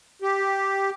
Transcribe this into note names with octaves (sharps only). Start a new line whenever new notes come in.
G4